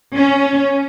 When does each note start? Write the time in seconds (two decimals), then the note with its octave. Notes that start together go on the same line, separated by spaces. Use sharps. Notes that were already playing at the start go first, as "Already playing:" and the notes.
0.15 C#4